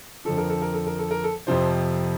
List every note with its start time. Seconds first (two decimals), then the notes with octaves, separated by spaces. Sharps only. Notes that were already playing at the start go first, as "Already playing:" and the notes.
0.25 F2 D3 F3 A4
0.38 A#4
0.50 A4
0.62 A#4
0.74 A4
0.87 A#4
0.99 A4
1.11 A#4
1.24 A4
1.47 F2 C3 F3 C5